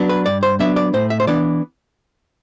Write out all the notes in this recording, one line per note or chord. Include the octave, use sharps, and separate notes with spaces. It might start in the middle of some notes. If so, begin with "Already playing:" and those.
Already playing: F#3 B3 D4
B4
G2 D5
C5
F#3 B3 D4 E5
D5
A2 C5
E5
C5
E3 B3 D4 D5